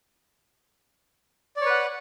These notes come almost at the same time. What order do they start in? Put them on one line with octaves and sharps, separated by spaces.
D5 C#5 B4 F#5